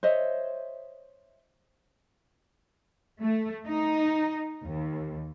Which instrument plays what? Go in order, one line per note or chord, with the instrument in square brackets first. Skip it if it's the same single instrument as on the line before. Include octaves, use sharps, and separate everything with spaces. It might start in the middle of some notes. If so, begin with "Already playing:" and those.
[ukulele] C5 C#5 D#5 E5
[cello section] A3
D#4
D#2